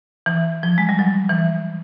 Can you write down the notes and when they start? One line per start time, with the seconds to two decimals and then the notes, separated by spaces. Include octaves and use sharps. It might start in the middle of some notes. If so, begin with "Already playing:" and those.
0.26 E3
0.63 F3
0.78 G#3
0.89 G3
0.99 F#3
1.29 E3